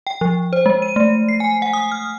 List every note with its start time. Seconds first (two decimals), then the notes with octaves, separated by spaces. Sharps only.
0.07 G5
0.21 F3
0.53 C5
0.66 G#3
0.82 D#7
0.96 A3
1.29 C7
1.40 G#5
1.62 F#5
1.73 D#6
1.92 F6